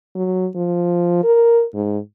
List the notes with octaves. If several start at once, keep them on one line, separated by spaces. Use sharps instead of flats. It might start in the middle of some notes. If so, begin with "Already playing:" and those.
F#3
F3
A#4
G#2